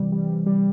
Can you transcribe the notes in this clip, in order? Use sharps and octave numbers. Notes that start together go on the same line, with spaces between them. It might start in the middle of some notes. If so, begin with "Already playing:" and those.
Already playing: C3 E3 G3
G3
G3